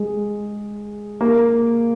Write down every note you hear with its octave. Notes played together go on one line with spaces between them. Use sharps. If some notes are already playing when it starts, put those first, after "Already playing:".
Already playing: G#3
A#3